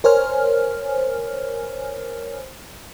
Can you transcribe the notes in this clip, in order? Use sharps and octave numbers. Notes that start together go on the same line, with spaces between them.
A#4 C5 C#5 G#5 F6